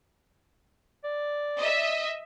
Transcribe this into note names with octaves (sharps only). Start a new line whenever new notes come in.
D5
D#5 E5